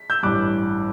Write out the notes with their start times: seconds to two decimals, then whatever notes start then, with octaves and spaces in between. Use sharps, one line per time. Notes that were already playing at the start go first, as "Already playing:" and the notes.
Already playing: B6
0.10 E6 G6
0.23 A1 G2 E3 G3 D6 F#6